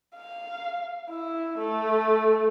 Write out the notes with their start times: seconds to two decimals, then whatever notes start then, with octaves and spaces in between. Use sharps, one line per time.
0.14 F5
1.10 E4
1.58 A3